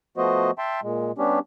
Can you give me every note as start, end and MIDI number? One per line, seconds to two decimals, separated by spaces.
0.17 0.51 53
0.17 0.51 57
0.17 0.51 59
0.17 0.51 66
0.17 0.51 72
0.17 0.51 75
0.58 0.80 76
0.58 0.80 79
0.58 0.80 81
0.58 0.80 84
0.83 1.12 46
0.83 1.12 56
1.18 1.39 55
1.18 1.39 59
1.18 1.39 61
1.18 1.39 62
1.18 1.39 67